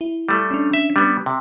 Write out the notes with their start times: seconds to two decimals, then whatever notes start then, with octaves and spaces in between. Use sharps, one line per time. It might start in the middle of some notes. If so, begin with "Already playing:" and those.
0.01 E4
0.29 G3 A3
0.51 C#4 D4
0.73 E5
0.96 G3 B3
1.26 C3